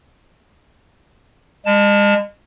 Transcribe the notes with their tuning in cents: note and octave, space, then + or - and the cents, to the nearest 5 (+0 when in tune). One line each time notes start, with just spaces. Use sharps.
G#3 -35 A5 +0